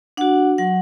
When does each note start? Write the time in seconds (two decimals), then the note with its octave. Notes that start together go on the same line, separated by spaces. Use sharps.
0.17 D4 F#4 F#5
0.58 F#3 F#5